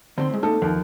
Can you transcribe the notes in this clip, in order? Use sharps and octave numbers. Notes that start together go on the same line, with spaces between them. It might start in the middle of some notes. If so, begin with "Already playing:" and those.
D3 D#3 C4 C6
A2 G#3
A#3 D#4 A4
D#2 F3